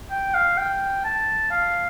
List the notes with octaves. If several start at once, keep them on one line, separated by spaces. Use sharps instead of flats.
G5
F5
G5
A5
F5